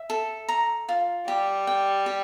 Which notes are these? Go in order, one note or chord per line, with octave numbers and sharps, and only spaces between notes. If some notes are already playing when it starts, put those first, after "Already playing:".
Already playing: E5
A4
A#5
F4
G3 G4
G5
G4